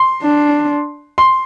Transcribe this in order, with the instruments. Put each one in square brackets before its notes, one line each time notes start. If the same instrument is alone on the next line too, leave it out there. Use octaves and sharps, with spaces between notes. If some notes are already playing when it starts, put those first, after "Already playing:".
Already playing: [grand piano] C6
[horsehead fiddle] D4
[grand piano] C6